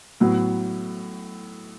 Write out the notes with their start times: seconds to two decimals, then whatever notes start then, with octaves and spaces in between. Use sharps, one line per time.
0.20 A2 F#3 B3